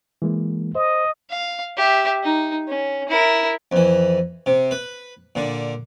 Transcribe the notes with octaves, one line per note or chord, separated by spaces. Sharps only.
E3 G#3 A#3
C5 D#5
F5
G4 E5
D#4
C#4
E4 A#4
F2 E3
C3
B4
A#2 D3